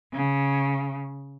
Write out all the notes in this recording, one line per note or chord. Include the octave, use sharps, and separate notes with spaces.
C#3